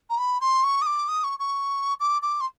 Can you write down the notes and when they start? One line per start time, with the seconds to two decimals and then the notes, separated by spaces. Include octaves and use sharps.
0.10 A#5
0.18 B5
0.41 C6
0.64 C#6
0.82 D#6
0.86 D6
1.08 D#6
1.24 C#6
1.39 C#6
2.00 D6
2.22 D6
2.41 C6